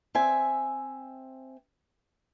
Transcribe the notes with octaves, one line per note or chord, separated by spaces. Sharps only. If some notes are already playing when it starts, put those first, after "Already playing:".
C4 E5 G#5